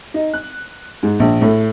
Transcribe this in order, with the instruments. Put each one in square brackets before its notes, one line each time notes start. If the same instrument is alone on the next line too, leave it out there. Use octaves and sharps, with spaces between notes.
[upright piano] D#4
F#6
G#2
A#1
A2